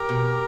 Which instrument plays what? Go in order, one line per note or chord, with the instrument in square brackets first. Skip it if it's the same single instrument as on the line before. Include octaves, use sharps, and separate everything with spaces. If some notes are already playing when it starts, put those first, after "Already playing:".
Already playing: [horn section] G4 A#4
[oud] B2